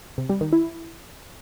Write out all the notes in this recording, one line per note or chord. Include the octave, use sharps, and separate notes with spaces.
C3
G3
D#3
E4